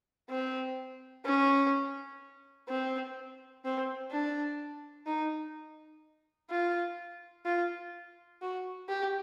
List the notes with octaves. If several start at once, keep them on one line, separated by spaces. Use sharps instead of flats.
C4
C#4
C4
C4
D4
D#4
F4
F4
F#4
G4